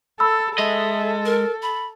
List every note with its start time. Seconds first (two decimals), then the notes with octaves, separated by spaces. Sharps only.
0.20 A4 B5 E6
0.58 G#3 A4 D#5 E5
1.25 A#4
1.62 B5